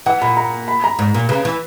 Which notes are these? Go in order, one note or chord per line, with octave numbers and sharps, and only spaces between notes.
E3 F#5
A#2 B5
A#5
B5
A#5
G#2
A#2
C#3 B4
E3